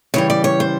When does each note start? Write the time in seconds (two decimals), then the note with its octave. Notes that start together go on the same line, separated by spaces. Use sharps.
0.14 C#3 E3 G3 C#5
0.30 D5
0.44 C#5
0.60 C5